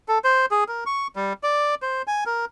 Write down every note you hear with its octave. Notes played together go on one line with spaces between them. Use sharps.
A4
C5
G#4
A#4
C#6
G3
D5
C5
G#5
A#4